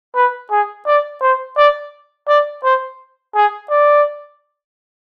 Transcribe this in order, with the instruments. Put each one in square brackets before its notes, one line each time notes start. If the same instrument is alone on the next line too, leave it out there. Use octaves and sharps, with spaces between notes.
[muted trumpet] B4
G#4
D5
C5
D5
D5
C5
G#4
D5